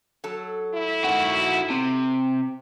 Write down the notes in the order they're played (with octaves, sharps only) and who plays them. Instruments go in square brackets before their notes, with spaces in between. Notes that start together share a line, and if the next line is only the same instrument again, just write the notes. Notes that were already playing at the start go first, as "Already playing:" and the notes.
[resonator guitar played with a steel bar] F#3 A4
[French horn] E4
[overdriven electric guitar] D#3 F#4
C3